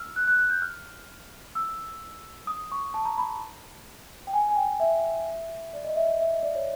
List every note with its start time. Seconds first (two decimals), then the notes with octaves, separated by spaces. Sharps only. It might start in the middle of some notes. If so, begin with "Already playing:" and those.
Already playing: E6 F6
0.16 F#6
0.27 F#6
0.39 F#6
0.50 G6
0.62 F6
1.55 E6
2.47 D#6
2.72 C#6
2.94 A5
3.05 A#5
3.18 B5
4.27 G5
4.33 G#5
4.49 G#5
4.56 G5
4.80 E5
5.73 D5
5.85 D#5
5.96 E5
6.08 D#5
6.20 E5
6.31 D#5
6.43 D5
6.55 C#5